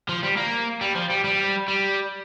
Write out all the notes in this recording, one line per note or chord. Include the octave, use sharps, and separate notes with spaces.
F3
G3
A#3
G3
F3
G3
G3
G3